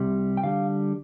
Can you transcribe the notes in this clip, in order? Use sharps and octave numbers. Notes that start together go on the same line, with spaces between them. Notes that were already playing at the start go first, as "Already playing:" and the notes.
Already playing: C2 C3 G3 G5
G5
D3 G3 F5